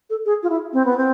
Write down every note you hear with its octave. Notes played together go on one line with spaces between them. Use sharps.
A4
G#4
F4
E4
C4
B3
C4